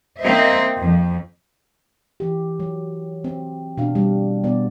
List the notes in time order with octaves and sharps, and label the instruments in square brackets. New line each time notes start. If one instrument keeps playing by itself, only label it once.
[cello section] A#3 C4 D#4 C5 D#5 E5
F2
[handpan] E3 G4
F#3
C4
B2 D4 F5
G3
B2 B3 D5